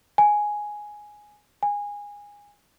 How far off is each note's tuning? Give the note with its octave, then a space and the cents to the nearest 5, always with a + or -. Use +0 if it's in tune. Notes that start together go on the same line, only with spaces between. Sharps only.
G#5 +5
G#5 -20